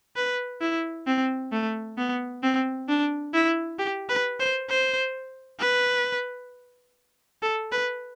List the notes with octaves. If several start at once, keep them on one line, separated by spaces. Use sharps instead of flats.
B4
E4
C4
A3
B3
C4
D4
E4
G4
B4
C5
C5
B4
A4
B4